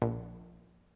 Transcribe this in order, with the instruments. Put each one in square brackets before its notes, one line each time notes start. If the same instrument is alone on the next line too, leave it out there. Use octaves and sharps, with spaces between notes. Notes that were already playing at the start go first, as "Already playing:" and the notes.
[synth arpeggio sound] A#1